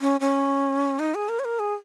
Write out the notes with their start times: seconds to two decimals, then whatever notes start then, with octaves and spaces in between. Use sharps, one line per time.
0.01 C#4
0.21 C#4
0.99 D#4
1.15 G#4
1.29 A#4
1.39 C#5
1.45 A#4
1.59 G#4